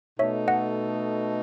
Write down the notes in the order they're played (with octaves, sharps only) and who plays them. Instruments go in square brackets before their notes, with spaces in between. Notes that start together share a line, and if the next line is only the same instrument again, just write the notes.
[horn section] B2 A3 D#4 A4 [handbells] C#5 E5
[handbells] D#5 F#5